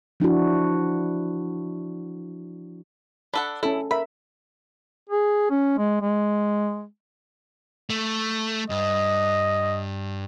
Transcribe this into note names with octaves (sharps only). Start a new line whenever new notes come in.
F3 D4 E4 F#4
D4 A4 F#5 B5
C#4 E4 A4
A#4 E5 B5
G#4
C#4
G#3
G#3
A3
G2 D#5